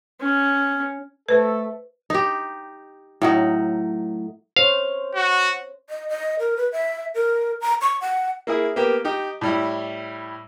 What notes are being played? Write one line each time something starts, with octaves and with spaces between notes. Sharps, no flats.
C#4
A3 A4 B4 C5
D#4 G4
A2 F#3 D#4
C5 C#5 F5
F#4
D#5
D#5
A#4
B4
E5
A#4
A#5
C#6
F#5
A#3 E4 G#4
A#3 B3 G4
D#4 G4
A2 G3 E4